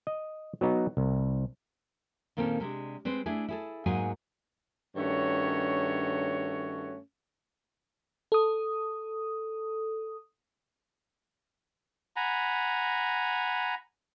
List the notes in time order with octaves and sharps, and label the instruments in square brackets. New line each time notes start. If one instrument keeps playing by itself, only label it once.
[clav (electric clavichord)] D#5
F#3 B3 D#4
C2
[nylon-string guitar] A#2 D#3 A#3 C4 C#4 A4
C3 G#3 D4
G#3 C4 B4 C5
A3 D4 E4 G#4
E4 G#4 A4
G#2 F#3 A#3 G#4 G#5
[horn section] G2 D#3 A3 C#4 F#4 C#5
[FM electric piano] A4 D#6
[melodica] F#5 G#5 A#5 B5